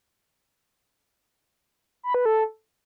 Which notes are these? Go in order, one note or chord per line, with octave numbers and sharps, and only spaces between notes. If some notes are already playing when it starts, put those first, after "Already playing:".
B5
B4
A4